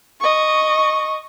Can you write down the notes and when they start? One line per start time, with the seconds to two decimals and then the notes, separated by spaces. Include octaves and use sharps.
0.20 D#5 C#6